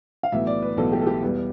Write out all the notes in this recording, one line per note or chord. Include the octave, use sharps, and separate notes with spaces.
F5
B1 A2 E3 B3 E5
D5
B4
B1 A2 E3 B3 A4
G4
A4
G4
E2 B2 G3 B4